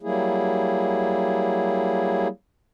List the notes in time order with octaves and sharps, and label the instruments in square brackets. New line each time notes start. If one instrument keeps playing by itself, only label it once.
[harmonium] F#3 G3 A#3 E4 G#4